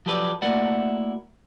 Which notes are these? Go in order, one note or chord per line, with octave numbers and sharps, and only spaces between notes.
F3 F#3 G4 A4 B4 D5
A3 A#3 E4 F#4 D5 F#5